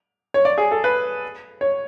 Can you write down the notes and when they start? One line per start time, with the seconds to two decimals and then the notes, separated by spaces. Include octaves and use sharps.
0.34 C#5
0.45 D5
0.58 G#4
0.71 A4
0.84 B4
1.61 C#5